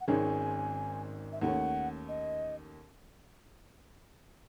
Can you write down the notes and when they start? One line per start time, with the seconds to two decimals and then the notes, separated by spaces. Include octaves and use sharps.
0.01 F#5
0.08 G#1 G#2 D#3 G#3 C#4 G#5
1.32 E5
1.41 D#2 D#3 A3 C#4 F#5
2.08 D#5